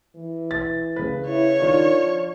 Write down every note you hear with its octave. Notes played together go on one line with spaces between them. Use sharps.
E3
A6
C#3 B4
E4 C#5
D#3 D4 F4
F3